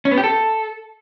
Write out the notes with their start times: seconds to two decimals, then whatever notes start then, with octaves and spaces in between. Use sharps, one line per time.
0.05 C#4
0.11 B3
0.17 G4
0.24 A4